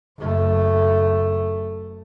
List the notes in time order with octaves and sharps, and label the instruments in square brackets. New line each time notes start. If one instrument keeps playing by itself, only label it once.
[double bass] F#1 A3